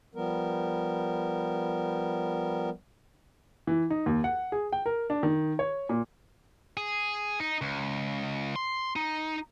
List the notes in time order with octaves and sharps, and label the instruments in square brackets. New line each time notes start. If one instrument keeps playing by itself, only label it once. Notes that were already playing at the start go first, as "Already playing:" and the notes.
[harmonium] F3 G3 B3 A#4
[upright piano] E3
D#4
D#2
F#5
G#4
G5
A#4
D4
D#3
C#5
A#2
[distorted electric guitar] G#4
D#4
C#2
C6
D#4